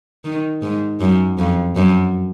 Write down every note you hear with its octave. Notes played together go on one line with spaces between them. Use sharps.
D#3
G#2
F#2
F2
F#2